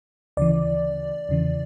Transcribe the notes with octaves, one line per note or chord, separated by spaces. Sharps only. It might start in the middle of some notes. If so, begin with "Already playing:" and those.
D2 C#3 E3 D5
E2 C#3 E3